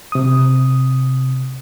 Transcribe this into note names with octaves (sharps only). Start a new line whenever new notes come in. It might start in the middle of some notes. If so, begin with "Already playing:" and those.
C3 D#6